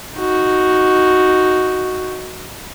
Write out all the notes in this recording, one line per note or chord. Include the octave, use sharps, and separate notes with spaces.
D#4 F#4